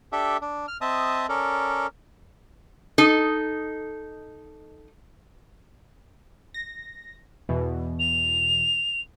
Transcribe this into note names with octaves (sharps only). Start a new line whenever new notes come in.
D4 G4 A4 E5
D4
F6
C4 D#5 E5 A5 D#6
C#4 A4 A#4 D5
D#4 A4 D#5
A#6
E2 B2 E3
F7